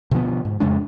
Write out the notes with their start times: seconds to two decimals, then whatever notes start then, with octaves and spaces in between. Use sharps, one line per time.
0.11 B2 D3 F3 B3
0.45 G#2
0.60 F2 C#3 G#3 D4